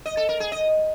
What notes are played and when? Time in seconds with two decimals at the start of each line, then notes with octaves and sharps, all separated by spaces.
0.06 D#5
0.17 A4
0.29 A#4
0.40 G#4
0.52 D#5